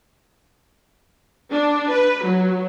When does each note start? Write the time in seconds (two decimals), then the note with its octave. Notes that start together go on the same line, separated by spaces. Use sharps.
1.52 D4
1.91 B4
2.24 F#3